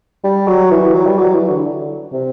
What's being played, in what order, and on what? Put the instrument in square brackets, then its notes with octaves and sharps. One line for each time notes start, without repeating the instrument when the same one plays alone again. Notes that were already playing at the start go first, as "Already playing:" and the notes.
[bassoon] G3
F#3
E3
E3
F#3
G3
F#3
E3
D3
C3